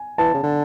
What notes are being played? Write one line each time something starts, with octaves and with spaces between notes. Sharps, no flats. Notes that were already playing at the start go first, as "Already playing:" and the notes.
Already playing: G#5
E3 A5
C#3
D3